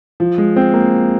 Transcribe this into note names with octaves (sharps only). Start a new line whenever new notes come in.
F3
G#3
C4
A#3